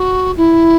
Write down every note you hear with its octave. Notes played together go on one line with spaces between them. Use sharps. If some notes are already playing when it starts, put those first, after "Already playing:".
Already playing: F#4
E4